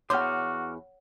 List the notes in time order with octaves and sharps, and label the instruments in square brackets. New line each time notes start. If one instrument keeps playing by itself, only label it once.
[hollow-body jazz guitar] E2 C6 [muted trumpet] F#4 [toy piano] C#5 F#5 [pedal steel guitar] D6 F6